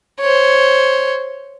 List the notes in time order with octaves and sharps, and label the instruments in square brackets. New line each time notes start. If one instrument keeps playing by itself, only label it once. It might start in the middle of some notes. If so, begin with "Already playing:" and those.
[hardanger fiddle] C5 C#5